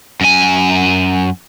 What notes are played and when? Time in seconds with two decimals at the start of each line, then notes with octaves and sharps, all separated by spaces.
0.21 F#2 G#5